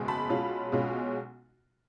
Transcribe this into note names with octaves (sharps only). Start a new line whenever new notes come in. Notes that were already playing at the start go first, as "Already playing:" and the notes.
Already playing: F#1 E2 B2 G#3
A5 B5
B1 B2 G#3 C#4 F4
B1 B2 G#3 C#4 F4